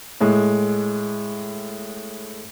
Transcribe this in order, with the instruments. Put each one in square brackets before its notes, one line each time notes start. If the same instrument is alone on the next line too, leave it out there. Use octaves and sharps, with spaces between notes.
[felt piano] A2 G#3